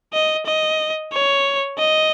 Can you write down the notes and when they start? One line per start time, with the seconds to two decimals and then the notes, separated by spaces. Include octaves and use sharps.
0.13 D#5
0.46 D#5
1.12 C#5
1.78 D#5